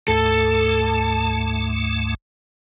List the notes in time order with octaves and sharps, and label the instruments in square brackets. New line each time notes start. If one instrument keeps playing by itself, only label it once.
[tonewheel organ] D2 G#2 A3 [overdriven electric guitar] A4